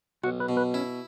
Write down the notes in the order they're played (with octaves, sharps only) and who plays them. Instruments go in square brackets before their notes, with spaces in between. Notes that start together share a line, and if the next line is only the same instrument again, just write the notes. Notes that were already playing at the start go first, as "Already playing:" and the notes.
[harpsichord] B1 [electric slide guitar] F#4
[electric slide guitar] B4
[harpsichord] B2
[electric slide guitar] B4
[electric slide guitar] C#4 [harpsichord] E4